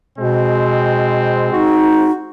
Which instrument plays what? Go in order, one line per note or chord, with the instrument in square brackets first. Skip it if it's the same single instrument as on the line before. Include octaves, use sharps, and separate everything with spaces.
[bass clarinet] B2 [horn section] G#3 C4
[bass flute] D#4 [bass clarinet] F#4